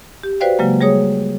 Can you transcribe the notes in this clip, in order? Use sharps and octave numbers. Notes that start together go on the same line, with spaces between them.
G4
F#4 B4 C5 D5 F5 G5
C#3 F#3 G#3 A#3
G3 G#4 C#5 D#6